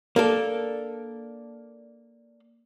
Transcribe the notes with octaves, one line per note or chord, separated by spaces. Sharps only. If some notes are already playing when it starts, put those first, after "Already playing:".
A#3 D4 A4